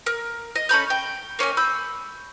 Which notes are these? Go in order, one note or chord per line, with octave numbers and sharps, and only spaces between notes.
A#4
D#5
C#4 A4 B5 G6
G5
A#3 C#4 D#4 G#5
B5 E6 G6